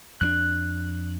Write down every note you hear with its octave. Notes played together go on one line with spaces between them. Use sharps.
F2 C4 D4 F#6